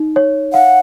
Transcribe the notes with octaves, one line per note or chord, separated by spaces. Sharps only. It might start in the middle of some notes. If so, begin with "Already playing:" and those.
Already playing: D#4
C#5
F5 F#5